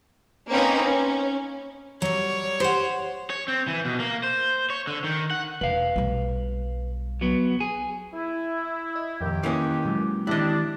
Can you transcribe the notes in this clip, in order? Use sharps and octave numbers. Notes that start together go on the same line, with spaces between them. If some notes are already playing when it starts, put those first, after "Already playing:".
A#3 C4 C#4 D#4 B4 C5
C#4
F#3 G3 C#5
G4 C5 F#5
C#5
C4
E3
B2
A#3
C5
C#5
D3
D#3
F#5
E1 B4 F5
B1 G3
F#3 B3
G#4
E4
D#5
F2 A#2 D#3 G4
E3 A#3 C#4 D6 D#6
A#2 F#3 G#3
D#3 E3 G3 G#3 C4 D4 E4 D#5